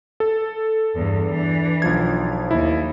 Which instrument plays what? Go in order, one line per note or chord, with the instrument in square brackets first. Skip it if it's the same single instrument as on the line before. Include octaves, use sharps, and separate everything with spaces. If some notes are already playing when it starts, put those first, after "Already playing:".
[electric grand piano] A4
[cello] E2 G2
E3 D4
[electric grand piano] B1 F3 G#6
[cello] D#2 [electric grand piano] E4